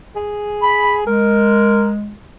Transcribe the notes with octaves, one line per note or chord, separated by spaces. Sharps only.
G#4
B5
G#3 A#4